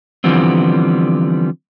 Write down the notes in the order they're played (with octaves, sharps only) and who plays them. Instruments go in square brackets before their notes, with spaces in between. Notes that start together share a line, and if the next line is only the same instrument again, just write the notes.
[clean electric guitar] D3 E3 F3 G3 B3 C4